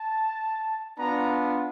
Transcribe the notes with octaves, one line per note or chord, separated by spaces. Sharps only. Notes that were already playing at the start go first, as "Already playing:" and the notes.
Already playing: A5
B3 D4 F4 A#5